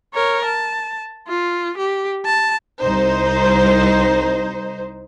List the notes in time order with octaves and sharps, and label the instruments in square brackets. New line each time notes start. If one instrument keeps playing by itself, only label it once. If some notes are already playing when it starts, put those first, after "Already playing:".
[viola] A#4 C#5
A5
F4
G4
A5
[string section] C2 D#4 C5